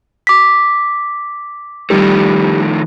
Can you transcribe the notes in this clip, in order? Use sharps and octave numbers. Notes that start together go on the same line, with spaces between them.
D6 B6
D#3 F3 G3 A3